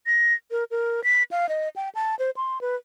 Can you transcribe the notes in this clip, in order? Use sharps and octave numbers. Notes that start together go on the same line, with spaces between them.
A#6
A#4
A#4
B6
F5
D#5
G5
A5
C5
C6
B4